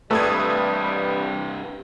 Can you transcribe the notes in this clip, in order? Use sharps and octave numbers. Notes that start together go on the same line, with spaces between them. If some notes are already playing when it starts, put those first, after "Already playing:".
G2 C3 G3 A3 B4 D#6 G#6